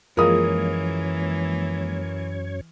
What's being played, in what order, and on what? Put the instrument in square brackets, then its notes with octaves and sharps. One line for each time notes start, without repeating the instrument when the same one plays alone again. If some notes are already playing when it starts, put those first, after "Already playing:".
[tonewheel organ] F#2 C#5 [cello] E3 [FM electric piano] F3 G#3 A#3 [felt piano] A#4 D#6